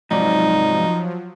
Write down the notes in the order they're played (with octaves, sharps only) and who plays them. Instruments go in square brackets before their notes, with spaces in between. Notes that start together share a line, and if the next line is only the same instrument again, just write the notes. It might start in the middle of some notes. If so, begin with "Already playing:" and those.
[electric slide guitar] G#2 C3 D5 [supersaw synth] F3 F#3 [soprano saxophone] D#4